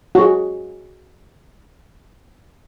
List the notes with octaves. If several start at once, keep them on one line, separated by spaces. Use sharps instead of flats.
F#4 G#4